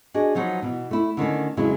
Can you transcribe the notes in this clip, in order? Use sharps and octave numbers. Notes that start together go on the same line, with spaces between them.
D4 F#4 G#4 D#5
F3 F#3 D#4 B4 C#5
B2 E3
A3 E4
D3 D#3 A3 C#4
F2 C#3 F#3 G#3 E4